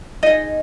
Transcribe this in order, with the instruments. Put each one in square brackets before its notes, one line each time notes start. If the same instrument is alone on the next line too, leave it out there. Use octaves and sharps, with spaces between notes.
[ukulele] D#4 G#4 D#5